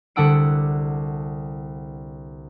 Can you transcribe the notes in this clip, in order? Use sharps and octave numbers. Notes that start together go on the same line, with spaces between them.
C2 D3 D4 F#5 E6 D7